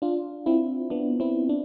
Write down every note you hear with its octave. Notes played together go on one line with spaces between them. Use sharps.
D4 F4
C4 E4
B3 D4
C4 E4
D4